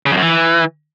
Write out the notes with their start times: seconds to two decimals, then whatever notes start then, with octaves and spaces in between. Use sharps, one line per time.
0.06 C#3
0.11 F2
0.17 F#2
0.22 E3